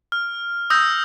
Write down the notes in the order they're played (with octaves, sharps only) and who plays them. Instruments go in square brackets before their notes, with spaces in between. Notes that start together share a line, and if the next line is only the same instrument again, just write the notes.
[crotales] F6
D#6 E6 G6 A#6